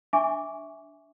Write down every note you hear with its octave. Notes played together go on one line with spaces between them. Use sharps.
D4 E5 G#5 C#6 D6